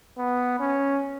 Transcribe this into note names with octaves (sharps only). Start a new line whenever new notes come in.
B3
C#4